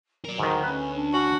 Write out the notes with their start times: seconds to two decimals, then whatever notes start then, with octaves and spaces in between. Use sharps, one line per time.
0.25 F#3 A#4 D5
0.39 D2 G#2 D#3
0.64 C#4 B4
0.95 D4
1.13 C#4 F#4